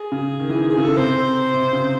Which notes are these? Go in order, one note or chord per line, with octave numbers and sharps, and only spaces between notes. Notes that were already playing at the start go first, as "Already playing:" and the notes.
Already playing: G#4
C#3
D#3
E3
D#3
G#4
C#3
A4
C3 C5
C3
C#3